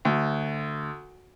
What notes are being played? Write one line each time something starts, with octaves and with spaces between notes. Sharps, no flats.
D2